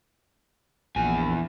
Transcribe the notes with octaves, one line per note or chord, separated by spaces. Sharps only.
A#1 E2 G#5